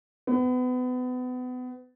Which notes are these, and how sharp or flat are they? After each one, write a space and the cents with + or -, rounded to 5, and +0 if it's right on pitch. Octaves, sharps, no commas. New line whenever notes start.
B3 +30